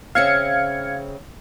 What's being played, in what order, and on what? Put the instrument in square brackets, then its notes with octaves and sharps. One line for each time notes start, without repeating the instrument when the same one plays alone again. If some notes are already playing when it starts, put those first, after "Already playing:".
[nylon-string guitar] C#3 C4 E5 [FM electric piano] F5 G#6 C#7